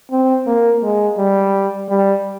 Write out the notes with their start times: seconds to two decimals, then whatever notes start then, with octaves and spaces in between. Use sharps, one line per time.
0.12 C4
0.47 A#3
0.83 G#3
1.18 G3
1.89 G3